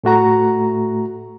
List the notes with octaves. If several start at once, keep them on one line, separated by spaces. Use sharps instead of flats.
A2 A3 F#4 A#5